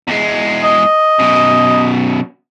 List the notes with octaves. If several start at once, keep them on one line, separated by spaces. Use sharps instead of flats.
E2 G#3
D#5
F#2 B2